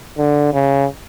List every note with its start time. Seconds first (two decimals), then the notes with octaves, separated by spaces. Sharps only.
0.18 D3
0.53 C#3